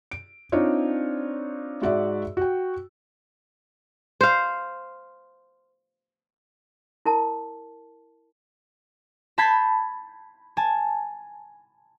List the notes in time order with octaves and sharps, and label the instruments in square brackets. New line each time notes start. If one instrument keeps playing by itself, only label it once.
[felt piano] D7
C4 D4 D#4 F4 C#5
G#2 F#4 D5 E5 E6
F#4 G5
[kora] C5 F5
[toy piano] E4 A#4 A5
[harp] A5 B5 G6 G#6 B6 C7
G#5 A5